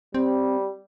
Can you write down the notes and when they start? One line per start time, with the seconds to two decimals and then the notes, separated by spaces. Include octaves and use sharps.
0.14 G3 C4